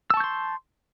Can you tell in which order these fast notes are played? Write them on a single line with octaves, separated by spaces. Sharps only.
E6 A5 C#6 G6 C6